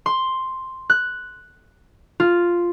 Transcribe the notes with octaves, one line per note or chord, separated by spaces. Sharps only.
C6
F#6
F4